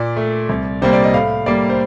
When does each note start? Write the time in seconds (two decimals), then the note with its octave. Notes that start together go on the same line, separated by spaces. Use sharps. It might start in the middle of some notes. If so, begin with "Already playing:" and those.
Already playing: A#2 D5
0.16 A3
0.49 C2
0.82 C3 G3 A#3 C5
0.93 D5
1.04 D#5
1.14 A2 F5
1.46 G3 A#3 D5
1.69 C5